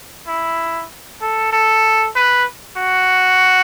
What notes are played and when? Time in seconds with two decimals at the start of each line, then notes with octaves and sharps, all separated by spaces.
0.28 E4
1.21 A4
1.53 A4
2.16 B4
2.77 F#4